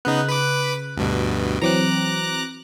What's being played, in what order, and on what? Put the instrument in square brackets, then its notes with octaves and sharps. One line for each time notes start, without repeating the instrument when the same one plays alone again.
[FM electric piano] C#3 F#6 [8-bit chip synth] B3 D#4
[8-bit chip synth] B4 B5 D6
D2 G2 B2
[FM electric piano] E3 F#3 C4 [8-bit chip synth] A#5 D6 F#6